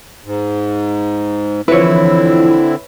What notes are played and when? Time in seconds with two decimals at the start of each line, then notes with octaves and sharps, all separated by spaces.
0.25 G#2
1.68 D3 E3 F3 C4 E4 B4 C#5